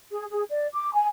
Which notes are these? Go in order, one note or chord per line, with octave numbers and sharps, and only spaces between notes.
G#4
G#4
D5
D6
G#5